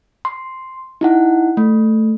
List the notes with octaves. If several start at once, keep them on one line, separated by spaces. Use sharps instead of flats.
C6
D#4 E4 F#5
A3